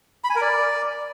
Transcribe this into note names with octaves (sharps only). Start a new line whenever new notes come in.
B5
G#5
A#4
D5